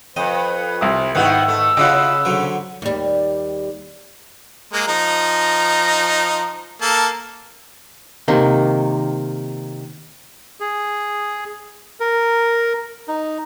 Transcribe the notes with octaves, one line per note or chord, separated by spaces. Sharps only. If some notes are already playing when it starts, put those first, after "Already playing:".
F2 B4 D#5
C2 C3 D#6
G#2 D#3 B3 E4 F#5 E6
A3
C#3 E4 F4 G4 D#5 F#5
D3 F#3 C5
D#2 G3
G#3 A#3
F3 D#4 A#5
A#3 A4 A5
C3 D#3 A#3
G#4
A#4
D#4